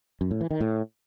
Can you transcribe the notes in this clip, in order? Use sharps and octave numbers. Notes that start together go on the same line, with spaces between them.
F#2
A2
E3
D#3
A2